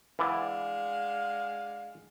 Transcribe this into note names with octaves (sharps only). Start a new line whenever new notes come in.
E3 G#3 D4 E4 D5 F5 F#5 D6